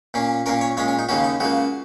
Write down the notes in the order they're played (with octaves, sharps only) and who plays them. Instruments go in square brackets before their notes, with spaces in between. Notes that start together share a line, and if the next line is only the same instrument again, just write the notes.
[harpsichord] A#2 A#3 C#4
A#2 A#3 C#4 A#4
C#5
A#2 G#3 C#4 C#5
C#4
D#4
D#2 C#3 A#3 C#4 F#4
D#4
C#2 C#3 A#3 F#4